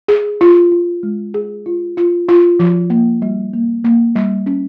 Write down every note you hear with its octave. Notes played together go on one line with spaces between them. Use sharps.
G#4
F4
F4
G#3
G#4
F4
F4
F4
F3
A#3
G3
A#3
A#3
G3
C#4